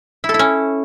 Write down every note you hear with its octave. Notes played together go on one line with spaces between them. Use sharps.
E4
A4
E4
C#4